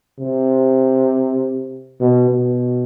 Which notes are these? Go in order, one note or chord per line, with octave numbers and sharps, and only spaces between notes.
C3
B2
B2